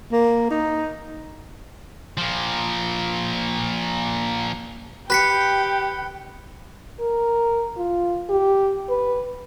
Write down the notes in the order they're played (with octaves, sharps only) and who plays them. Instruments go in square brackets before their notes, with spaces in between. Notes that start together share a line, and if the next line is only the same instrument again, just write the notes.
[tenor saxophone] A#3
D#4
[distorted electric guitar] A#2 F3
[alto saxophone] G4 [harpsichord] B4 [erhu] G5 [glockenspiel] F#6 B6 C#7
[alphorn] A#4
F4
G4
B4